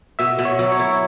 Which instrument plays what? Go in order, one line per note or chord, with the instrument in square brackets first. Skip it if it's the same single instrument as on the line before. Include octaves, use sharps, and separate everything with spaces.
[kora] B2 [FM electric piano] E5
[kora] B2
[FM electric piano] C#5
[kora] F#3
[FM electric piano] C#5
[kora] E4